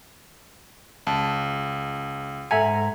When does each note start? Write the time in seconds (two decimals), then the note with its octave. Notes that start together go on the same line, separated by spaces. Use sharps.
1.07 C#2 A5
2.51 G#2 A4 E5 F#5 G#5 A#5